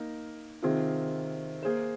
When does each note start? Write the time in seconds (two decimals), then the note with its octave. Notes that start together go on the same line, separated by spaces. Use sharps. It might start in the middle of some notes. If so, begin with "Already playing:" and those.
Already playing: A#3 D#4 A#4
0.62 C3 D#3 C4 F4 G#4
1.63 A#3 G#4 C5